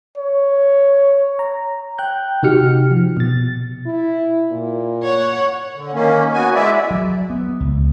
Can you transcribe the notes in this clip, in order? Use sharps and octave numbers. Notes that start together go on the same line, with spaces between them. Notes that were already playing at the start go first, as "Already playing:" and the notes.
C#5
A#5
G5 F#6 G6
C3 D#4 F#4 G4 F6 C#7
F3
B2 A6
E4
A#2
C#5 F#5
D3
D#3 A#3 C#4
B3 F#4 G#5
G#3 E4 D5 E5
F#3
B3
C#2